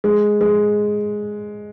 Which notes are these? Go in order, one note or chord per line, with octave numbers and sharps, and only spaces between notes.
G#3
G#3